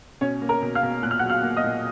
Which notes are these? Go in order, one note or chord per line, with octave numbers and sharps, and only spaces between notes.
B2 C#4 C#5
A#3
A#4 A#5
B2
F5 F6
B2
A#2 F#6
F6
F#5 F#6
F#3
F5 F6
A#3
D#5 D#6
A#2